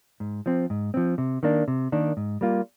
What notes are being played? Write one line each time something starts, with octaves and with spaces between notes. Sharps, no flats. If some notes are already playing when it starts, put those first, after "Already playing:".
G#2
F3 C4
G#2
F3 C4
C3
D#3 A#3 D4
C3
D#3 A#3 D4
G#2
G3 A#3 F4